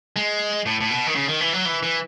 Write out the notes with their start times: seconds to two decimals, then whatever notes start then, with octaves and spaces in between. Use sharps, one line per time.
0.16 G#3
0.66 A2
0.80 A2
0.91 B2
1.07 D#3
1.15 C#3
1.28 D#3
1.40 E3
1.53 F#3
1.65 E3
1.83 E3